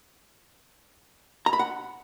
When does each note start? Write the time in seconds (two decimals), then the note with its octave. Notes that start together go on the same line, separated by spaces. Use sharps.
1.46 A#5
1.53 B5
1.59 F#5